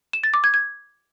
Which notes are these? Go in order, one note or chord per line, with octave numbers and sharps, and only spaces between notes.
E7
A6
D6
G#6
G#6